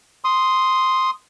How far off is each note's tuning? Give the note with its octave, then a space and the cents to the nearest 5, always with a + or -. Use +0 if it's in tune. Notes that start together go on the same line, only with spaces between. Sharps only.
C6 +0 D#6 +5